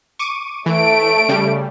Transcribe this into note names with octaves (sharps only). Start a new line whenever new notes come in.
C#6 D6 D#7
E3 A3 D7
C#3 G3